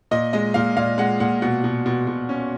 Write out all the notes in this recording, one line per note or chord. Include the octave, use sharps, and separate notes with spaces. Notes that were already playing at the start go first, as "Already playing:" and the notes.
A#2 D#5
G#3 D#5
A#2 F5
A#2 F5
G#3 F#5
A#2 F#5
B2 F#5
B2
B2
B2
C#4